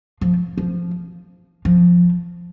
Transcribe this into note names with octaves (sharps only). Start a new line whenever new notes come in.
F3
F3
F3